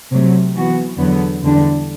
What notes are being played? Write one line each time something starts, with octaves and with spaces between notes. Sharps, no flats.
C3 F#3 A3
E3 B3 F#4
E2 D3 F#3 B3
E2 D3 G3 D4